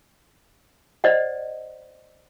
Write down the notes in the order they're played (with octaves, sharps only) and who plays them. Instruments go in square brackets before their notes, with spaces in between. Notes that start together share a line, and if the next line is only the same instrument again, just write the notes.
[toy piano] C5 D5 D#5 F#5